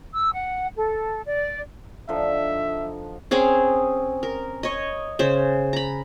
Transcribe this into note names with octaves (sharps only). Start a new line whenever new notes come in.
E6
F#5
A4
D5
D3 F3 D#4 E5
C4 C#4 G#4 F5
A#4
C#5 D#5
C#3 C5
A#5 B5